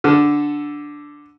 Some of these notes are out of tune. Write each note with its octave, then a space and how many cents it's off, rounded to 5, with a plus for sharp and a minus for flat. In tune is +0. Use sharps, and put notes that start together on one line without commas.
D3 +0 A4 +0